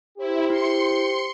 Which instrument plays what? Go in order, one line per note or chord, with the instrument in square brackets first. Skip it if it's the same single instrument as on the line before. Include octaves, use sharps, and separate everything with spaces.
[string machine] E4 [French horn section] G4 C5
[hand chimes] E4 [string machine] C6 C#7